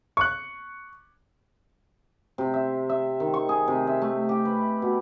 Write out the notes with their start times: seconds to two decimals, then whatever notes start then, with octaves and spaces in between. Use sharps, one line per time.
0.17 C#6 F#6
2.38 C3
2.54 E5
2.89 E5
3.20 D#3
3.34 C#6
3.49 G#4
3.68 C3
3.87 E5
4.02 A3
4.29 G4
4.45 B4
4.82 B2